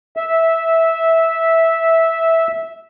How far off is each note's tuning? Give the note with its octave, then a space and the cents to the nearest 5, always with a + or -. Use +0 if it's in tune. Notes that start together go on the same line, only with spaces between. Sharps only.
E5 -10